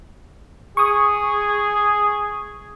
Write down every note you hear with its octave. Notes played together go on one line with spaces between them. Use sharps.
G#4 C#6 D#6